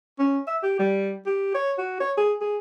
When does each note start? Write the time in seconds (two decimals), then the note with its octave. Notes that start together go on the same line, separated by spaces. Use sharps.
0.19 C#4
0.48 E5
0.63 G4
0.79 G3
1.26 G4
1.55 C#5
1.79 F#4
2.01 C#5
2.18 G#4
2.41 G#4